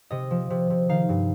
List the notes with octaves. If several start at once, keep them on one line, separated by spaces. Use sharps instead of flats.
C3 D#5
F3
C3
C3
D#3 F5
G2